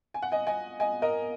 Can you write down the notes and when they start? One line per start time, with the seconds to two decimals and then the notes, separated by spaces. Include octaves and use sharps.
0.14 G#5
0.22 F#5
0.32 D#5 G#5
0.47 D#5 G#5
0.80 D#5 G#5
1.02 A#4 D#5